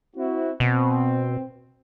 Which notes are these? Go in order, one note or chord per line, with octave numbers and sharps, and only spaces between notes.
C4 E4 F#4
B2 C4